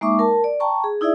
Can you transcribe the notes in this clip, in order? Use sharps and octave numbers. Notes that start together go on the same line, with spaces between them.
G#3 A#3 D#4 E5 C#6 D6
A#4 A5
D5
G5 A5 A#5 C#6
G#4
D#4 E4 G#4 D5 E5